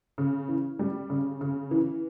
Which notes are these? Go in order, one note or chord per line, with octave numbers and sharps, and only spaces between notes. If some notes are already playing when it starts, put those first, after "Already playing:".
C#3
E3
G3
C#3
C#3
E3